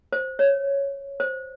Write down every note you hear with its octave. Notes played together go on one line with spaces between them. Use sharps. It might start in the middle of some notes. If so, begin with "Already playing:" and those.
C5
C#5
C5